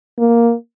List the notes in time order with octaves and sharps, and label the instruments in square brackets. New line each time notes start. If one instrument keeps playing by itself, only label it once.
[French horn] A#3